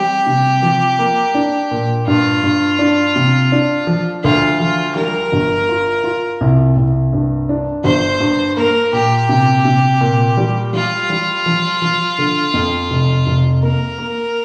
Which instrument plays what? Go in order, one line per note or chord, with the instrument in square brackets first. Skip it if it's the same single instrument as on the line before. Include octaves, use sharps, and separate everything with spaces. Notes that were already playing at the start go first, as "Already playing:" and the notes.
Already playing: [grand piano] G3 C4 [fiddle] G4
[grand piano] C3
F3
A#3
D4
A#2
[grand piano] G2 [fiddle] F4
[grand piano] G2
D4
C3
D4
F3
[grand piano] D2 [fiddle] F4
[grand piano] F3 [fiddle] F4
[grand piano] G3 [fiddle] A#4
[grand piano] G1
F4
F4
C2
C2
G2
D4
[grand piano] G1 [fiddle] C5
[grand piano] G2
[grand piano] A#3 [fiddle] A#4
[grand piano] A#2 [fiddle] G4
[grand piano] C3
C3
A#2
G3
[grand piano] G3 [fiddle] F4
[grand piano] G3
F3
F3
D3
F2
F1
F1
[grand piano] A#3 [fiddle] A#4
[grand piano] A#3